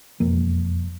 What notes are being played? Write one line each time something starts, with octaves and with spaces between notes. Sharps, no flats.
E1 F2 A#3